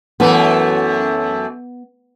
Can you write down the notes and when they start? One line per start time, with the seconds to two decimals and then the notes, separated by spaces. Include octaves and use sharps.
0.20 F#2 E3 A3 B3